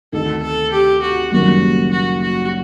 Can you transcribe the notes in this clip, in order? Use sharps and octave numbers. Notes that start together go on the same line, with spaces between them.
D2 C3 D#3 A3 D#4 A4
A4
G4
F#4
F#1 F#2 D#3 G3 A#3 F#4
F#4
F#4